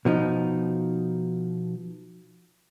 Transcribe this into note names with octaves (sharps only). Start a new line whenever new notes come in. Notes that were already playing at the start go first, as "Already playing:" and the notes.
B2 F3 D#4